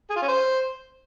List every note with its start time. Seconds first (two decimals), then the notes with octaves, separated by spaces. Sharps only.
0.10 G#4
0.16 F4
0.22 C#4
0.28 C5